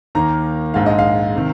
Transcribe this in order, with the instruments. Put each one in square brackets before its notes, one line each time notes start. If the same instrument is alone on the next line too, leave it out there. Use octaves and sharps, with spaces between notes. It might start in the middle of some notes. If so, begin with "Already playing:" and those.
[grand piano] D#2 D#3 A#3 A#5
A#1 G#2 G#3 F5
D#5
F5
C3 D#3